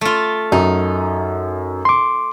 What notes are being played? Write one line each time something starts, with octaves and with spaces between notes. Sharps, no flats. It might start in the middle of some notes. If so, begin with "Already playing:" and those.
A3 F4
F#2 D#4
C6 D6